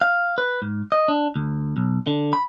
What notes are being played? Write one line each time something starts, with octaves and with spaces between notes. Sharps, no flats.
F5
B4
G#2
D#5
D4
D2
B1
D3
B5